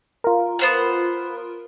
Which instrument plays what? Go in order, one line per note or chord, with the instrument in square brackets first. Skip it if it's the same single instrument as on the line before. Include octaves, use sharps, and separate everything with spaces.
[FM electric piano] F4 A#4
[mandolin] B3 C5 F#5